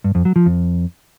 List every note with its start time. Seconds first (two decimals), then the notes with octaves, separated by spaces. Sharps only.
0.04 G2
0.15 F2
0.25 F#3
0.36 F3
0.46 F2